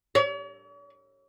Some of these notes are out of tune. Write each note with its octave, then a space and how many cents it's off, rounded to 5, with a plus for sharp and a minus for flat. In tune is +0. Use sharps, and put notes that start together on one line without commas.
C#5 +45